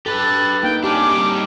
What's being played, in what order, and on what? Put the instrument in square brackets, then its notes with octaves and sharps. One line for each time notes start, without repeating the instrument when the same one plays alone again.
[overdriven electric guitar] G4 B4 [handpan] A4 [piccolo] A6
[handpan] A#3 D#4 [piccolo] G5
[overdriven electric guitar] C#4 D4 [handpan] G4 [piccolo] D6
[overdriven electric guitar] G3 D#4